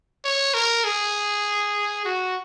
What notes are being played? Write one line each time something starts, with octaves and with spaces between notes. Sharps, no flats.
C#5
A#4
G#4
F#4